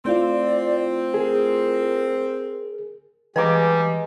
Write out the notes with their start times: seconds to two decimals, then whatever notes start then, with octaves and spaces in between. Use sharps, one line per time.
0.05 A3 C4 E4 F4 D5
1.14 G#4 A#4
3.36 E3 G3 G#3 B4 A#5 D6